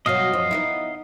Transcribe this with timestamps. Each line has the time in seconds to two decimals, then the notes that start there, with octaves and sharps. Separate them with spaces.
0.06 B2 F#3 D#5 F5
0.33 F#2 F3
0.51 B3 D#4 E4